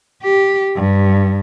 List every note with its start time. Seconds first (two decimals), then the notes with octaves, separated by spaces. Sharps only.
0.24 G4
0.76 G2